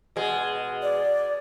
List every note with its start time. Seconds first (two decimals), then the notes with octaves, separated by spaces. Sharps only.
0.16 B2 G#3
0.82 D5